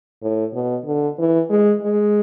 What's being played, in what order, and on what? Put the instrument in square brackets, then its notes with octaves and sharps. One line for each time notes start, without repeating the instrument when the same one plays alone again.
[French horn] A2
B2
D3
E3
G#3
G#3